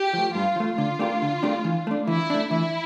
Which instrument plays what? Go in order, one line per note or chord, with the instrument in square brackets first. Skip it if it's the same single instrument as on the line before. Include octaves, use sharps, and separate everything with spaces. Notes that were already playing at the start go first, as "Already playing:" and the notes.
Already playing: [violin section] G4
[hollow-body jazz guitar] F3 A3
[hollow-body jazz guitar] G2 [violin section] F4
[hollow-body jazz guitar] F3
A3
[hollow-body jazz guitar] D3 [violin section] F4
[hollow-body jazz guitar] A3 D4 G4 A#4
D3
A3 D4 G4 A#4
E3
A3 D4
[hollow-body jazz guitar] E3 [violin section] E4
[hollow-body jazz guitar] A3 D4
[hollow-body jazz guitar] E3 [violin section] E4